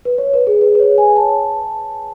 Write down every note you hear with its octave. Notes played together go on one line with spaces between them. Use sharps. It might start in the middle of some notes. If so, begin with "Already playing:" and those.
B4
C#5
B4
G#4
B4
B4
C#5
G#5
A5